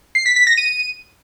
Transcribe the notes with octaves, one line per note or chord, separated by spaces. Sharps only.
C7
B6
B6
A#6
D#7